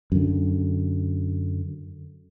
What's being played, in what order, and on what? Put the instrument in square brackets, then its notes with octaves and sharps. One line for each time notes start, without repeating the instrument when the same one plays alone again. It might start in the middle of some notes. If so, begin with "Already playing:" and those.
[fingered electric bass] F#2 D3